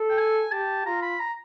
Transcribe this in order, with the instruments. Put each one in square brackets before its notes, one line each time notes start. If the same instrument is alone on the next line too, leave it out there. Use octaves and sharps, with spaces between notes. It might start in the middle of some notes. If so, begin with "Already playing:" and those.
Already playing: [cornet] A4
[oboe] G5
G#5
[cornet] G4 [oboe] A5
[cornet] F4 [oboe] A#5
[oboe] B5
A#5